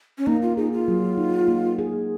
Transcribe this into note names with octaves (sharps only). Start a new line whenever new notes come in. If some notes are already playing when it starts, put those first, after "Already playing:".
C#4
A#3 D#4
F4
D#4 G#4
F4
F#3
D#4
A#3
G#4